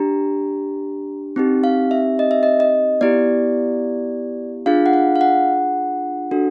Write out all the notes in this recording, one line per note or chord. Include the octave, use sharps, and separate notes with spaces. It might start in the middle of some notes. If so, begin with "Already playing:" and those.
Already playing: D4 G4 A#5
C4 D#4 G4
F5
E5
D#5
E5
D#5
D#5
B3 E4 G4 D5
D4 F4 G#4 F5
F#5
F5
F5
F#5
D4 F#4 A4